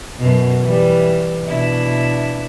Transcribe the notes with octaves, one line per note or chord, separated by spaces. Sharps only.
F#2 B2
E3 G3
B2 D4 E4